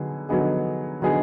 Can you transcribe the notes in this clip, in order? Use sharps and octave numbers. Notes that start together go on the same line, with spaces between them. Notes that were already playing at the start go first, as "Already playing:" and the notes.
Already playing: D3 F#3 B3 D#4 G#4
D3 F#3 B3 D#4 G#4
D3 F#3 B3 D#4 G#4